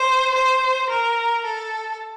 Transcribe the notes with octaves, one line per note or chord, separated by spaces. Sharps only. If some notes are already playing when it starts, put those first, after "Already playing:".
Already playing: C5
C5
A#4
A4